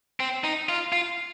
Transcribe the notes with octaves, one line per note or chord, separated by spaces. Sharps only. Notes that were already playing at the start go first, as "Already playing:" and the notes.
C4
D#4
F4
F4